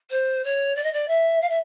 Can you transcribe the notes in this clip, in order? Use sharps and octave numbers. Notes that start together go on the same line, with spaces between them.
C5
C#5
D5
D#5
D5
E5
F5
E5